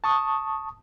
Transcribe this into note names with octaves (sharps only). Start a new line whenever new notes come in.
A5 C#6 D#6